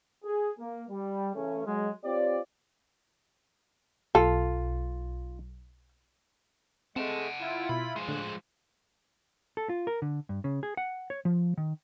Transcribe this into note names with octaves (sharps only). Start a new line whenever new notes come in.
G#4
A#3
G3
C#3 E3 A3 C#4
F#3 G#3
C4 F4 G4 C#5 D5
B1 F4 A4
G#3 A3 C4 F#5 A5
E4 F4
B2 B5
F3 G#3 C6 C#7
A2 D3 F#6
A4
F4
A#4
D3
G2
C#3
G#4
F#5
C#5
F3
D#3